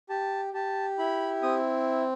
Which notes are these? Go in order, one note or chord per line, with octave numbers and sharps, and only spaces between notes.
G4 A5
G4 A5
E4 B5
C4 D#6